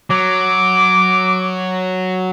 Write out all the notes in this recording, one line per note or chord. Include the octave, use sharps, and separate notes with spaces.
F#3 D6